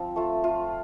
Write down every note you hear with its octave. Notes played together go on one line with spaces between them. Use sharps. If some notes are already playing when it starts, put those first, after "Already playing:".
Already playing: F3 C4
A3 F4
A3 F4